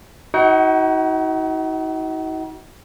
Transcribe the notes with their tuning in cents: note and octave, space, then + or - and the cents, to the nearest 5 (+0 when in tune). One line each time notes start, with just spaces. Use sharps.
D#4 +40 F#4 +10 F#5 +40